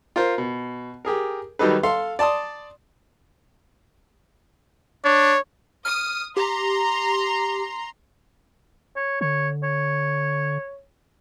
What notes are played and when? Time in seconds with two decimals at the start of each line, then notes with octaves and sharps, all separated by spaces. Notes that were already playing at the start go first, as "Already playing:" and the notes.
0.16 F4 A#4 C5
0.38 B2
1.05 G4 G#4 A#4
1.59 D#3 F#3 G3 D#4 A4 B4
1.83 A4 F5 C6
2.19 D5 A5 C6 D#6
5.05 D4 C#5
5.85 D#6 F6
6.37 G4 A#5 C6
8.96 C#5
9.21 D3 C#5
9.63 C#5